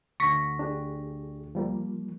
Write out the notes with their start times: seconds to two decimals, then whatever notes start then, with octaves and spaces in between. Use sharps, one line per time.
0.20 D2 D3 C#6 A#6 B6
0.59 D4 G4 G#4
1.55 F3 G3 A#3